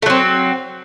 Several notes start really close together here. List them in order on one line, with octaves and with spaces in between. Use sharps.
A3 F#3 C4